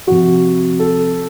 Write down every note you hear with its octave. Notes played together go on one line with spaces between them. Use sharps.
C3 F3 F#4
A4